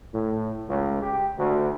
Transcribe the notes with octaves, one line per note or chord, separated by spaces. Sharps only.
A2
C#2
G4
D2